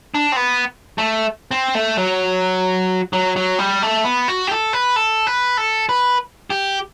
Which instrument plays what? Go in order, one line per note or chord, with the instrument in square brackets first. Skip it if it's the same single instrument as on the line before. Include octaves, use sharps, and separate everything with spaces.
[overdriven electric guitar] D4
C4
B3
A3
C4
A3
F#3
F#3
F#3
G3
A3
B3
F#4
G4
A4
B4
A4
B4
A4
B4
G4